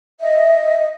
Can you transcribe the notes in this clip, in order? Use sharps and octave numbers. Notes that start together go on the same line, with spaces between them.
D#5 E5